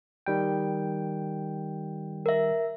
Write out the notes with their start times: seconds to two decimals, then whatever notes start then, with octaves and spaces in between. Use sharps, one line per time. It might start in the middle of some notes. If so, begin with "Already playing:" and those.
0.26 D#3 G3 G5
2.26 A#4 E5